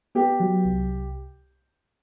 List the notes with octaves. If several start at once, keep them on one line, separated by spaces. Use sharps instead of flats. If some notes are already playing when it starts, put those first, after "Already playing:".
B3 G4
F#3
C2